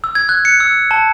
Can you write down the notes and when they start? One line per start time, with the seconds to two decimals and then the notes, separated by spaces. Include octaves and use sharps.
0.04 E6
0.15 G#6
0.29 F#6
0.45 C#7
0.60 E6
0.91 A5